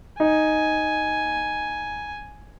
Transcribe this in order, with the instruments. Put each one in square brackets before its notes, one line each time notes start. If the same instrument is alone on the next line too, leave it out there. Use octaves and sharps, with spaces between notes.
[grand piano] D#4 [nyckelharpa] G#5